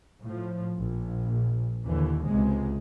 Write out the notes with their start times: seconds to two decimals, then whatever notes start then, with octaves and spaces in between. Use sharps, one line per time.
0.23 A2 F3
0.77 A#1
1.85 D#2 D3 E3
2.25 C#2 C3 G#3